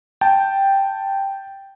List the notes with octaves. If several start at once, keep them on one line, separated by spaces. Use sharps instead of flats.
G5 A5